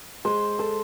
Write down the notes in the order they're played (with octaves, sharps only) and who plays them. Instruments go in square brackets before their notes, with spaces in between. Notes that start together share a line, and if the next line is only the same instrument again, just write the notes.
[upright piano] G#3 [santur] C5
[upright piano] A4 [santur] C5